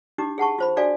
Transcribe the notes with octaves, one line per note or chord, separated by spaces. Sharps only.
D4 D#4 G4 D6
G#4 F#5 A5 C#6
F4 C5 B5
D4 F#4 A4 D5 F5 G#5